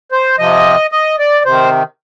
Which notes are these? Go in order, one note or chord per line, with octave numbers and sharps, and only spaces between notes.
C5
C3 F3 D#5
D#5
D5
C3 D#3 C5